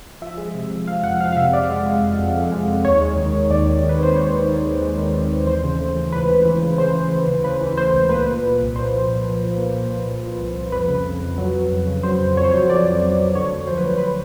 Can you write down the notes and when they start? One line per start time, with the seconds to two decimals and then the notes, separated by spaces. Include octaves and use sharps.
0.21 F3 E5
0.37 G#3
0.55 C3
0.71 F3
0.87 F3 F5
1.03 F2 F#5
1.20 F3 F5
1.32 F5
1.37 C3 E5
1.53 C3 D5
1.70 G#3
1.86 G#3
2.02 F2
2.19 F2
2.35 F2
2.52 G#3
2.68 F2
2.85 D#2 C#5
3.01 G#3
3.17 D#3
3.34 D#3
3.50 D#2 D5
3.66 D#3
3.83 D#3
3.89 B4
3.99 C4 C5
4.15 C4 C#5
4.33 D#2
4.49 D#3
4.65 G#3
4.81 G#3
4.98 D#3
5.14 C4
5.31 D#2
5.47 E3 C5
5.64 C#3
5.80 A3
5.96 E3
6.12 C#2 B4
6.29 E3
6.45 E3
6.62 C#3
6.78 C#3 C5
6.95 E3
7.12 E3
7.27 C#3
7.44 C#3 B4
7.61 E3
7.77 A3 C5
7.93 C#2
8.09 A#2 B4
8.27 A#3
8.43 A#2
8.60 C2
8.75 A#2 C5
8.92 F3
9.08 A#2
9.25 F3
9.41 F3
9.58 A#3
9.74 A#2
9.90 F3
10.06 A#2
10.23 F3
10.40 C2
10.56 C2
10.72 F2 B4
10.89 C#3
11.05 F2
11.22 F2
11.38 F#3
11.54 F#3
11.71 F2
11.87 C#3
12.03 F#3 C5
12.20 F2
12.36 F2 C#5
12.44 C5
12.51 F#3 C#5
12.69 F2 D5
12.86 F2
13.02 F#3
13.19 F#3
13.35 D3 C#5
13.52 D2
13.67 F3 C5
13.78 B4
13.85 D2
13.98 B4